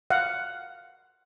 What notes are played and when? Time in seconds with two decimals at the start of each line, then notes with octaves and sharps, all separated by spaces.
0.10 F5 F#5